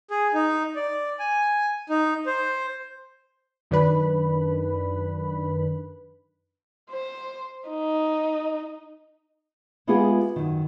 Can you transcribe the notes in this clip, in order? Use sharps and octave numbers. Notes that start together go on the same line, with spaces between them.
G#4
D#4
D5
G#5
D#4
C5
F#2 D#3 D4 B4 B5
C5
D#4
G#3 B3 E4 F4 G4 G#4
F#2 D#3